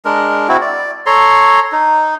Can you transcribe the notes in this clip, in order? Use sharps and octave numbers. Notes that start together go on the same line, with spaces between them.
G#3 D4 A#4
C4 E4 F#4
D5
A4 C#5 A#5 C6
D#4